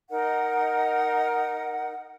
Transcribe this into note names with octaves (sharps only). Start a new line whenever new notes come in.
D#4 A#4 D#5 F#5